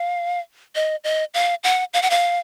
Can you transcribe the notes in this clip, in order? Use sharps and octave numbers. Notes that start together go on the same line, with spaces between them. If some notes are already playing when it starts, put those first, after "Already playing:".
Already playing: F5
D#5
D#5
F5
F#5
F5
F#5
F5